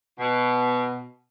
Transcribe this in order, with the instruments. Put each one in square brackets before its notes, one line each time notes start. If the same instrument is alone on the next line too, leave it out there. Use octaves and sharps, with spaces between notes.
[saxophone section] B2